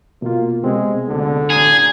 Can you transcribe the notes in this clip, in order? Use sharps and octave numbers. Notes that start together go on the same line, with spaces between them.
B2 A#3 F4
C3 G#3 B3 C4
D2 D3
A1 G#4 A#5